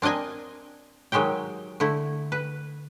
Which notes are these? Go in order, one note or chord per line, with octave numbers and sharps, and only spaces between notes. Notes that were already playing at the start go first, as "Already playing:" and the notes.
C4 D4 A#4 D#5 G#5
D#3 F#3 G#3 G4 G5
D3 A3 E4
B4